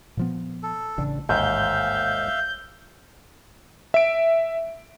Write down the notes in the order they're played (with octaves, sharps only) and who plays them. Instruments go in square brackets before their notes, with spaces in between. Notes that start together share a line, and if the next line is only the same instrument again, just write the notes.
[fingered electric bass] A#2 F3 B3
[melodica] A4
[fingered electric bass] A1 C#3 [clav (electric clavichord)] D4
[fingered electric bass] A1 [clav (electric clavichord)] D#2 G#2 [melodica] E5 F5 [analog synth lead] G6
[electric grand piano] E5 D7